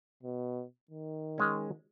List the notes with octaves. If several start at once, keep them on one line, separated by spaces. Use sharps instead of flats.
B2
D#3
G#3 C#4